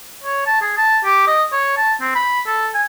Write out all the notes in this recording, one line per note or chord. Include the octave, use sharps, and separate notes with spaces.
C#5
A5
G#4
A5
G4
D#5
C#5
A5
C4
B5
A4
G#5